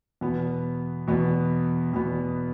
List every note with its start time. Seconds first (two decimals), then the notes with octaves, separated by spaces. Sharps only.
0.21 E2 B2 B3
1.07 E2 B2 B3
1.93 E2 B2 B3